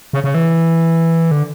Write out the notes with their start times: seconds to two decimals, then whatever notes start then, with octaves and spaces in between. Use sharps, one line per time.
0.13 C#3
0.24 C#3
0.35 E3
1.31 D3